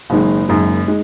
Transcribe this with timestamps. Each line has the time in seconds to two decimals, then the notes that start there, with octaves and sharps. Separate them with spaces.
0.10 F#1 F#2 D#3 G#3 D#4
0.49 F#1 F#2 D#3 G#3 D#4
0.88 G#3 D#4